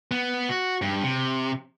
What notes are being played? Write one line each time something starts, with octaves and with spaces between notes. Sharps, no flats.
B3
F#4
G2
C3